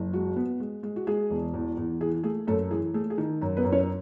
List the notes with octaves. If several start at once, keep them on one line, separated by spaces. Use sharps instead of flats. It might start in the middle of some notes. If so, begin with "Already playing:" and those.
Already playing: F#1
G#3 F#4
B3
G#3
G#3
F#4
G#3 G#4
E1
E2
E2
E3 G#4
A3 G#4
F#2 A3 A4
E3 G#4
A3 G#4
G#4
D#3
F#2
B3 B4
F#2
C#4 C#5